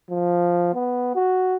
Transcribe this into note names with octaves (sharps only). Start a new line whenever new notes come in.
F3
B3
F#4